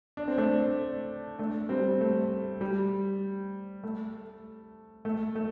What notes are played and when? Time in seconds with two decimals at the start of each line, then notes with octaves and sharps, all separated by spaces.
0.17 D4
0.28 C4
0.38 A3 D4
1.39 A3 D4
1.69 G3 C4
2.01 A3
2.61 G3
3.84 A3
5.05 A3
5.35 A3